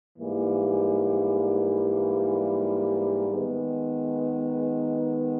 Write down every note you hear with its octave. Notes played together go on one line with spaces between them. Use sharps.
G#2 E3 G3 A#3
D#3 G#3 B3